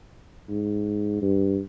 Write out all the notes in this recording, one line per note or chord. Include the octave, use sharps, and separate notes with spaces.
G#2
G2